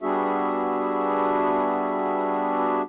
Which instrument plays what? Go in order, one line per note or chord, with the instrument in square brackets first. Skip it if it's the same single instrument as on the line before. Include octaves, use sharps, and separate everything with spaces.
[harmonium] G3 B3 D4 F#4 G#4 E5